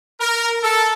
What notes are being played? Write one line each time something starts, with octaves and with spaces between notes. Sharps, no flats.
A#4
A4